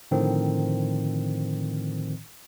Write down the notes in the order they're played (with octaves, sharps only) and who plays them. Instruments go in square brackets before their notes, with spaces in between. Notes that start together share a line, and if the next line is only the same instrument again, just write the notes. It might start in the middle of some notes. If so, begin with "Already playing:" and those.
[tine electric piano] A2 D3 D#3 F3 C4